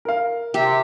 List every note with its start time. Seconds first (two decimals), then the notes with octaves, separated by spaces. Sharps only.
0.05 A#4 F5
0.54 C3 G4 E5